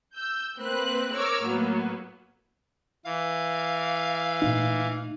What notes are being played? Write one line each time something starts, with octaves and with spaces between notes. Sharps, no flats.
E6 G6
A#3 C4 B4 F#6
A#4 C#5 D6 E6 F6
A2 F#3 A#3 B3
E3 F5
A#2 A3 D#4